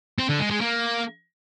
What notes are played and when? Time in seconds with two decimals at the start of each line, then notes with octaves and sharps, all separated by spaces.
0.19 C4
0.29 D3
0.40 G#3
0.51 G#3
0.61 A#3